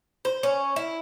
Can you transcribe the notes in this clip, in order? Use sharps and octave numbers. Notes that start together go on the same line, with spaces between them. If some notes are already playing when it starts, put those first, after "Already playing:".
C5
C#4
E4